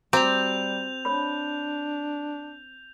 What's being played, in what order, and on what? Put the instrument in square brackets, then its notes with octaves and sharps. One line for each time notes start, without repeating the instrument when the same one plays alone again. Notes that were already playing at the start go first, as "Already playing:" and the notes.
[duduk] G3 [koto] C4 [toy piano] F#4 A#5 D6 [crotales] G6 F7
[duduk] D4 [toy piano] C#5 B5